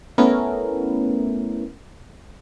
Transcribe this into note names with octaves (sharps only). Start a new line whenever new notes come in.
A3 B3 C#4 E4 A#4